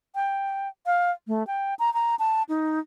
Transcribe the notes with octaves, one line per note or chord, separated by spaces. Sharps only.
G5
F5
A3
G5
A#5
A#5
A5
D#4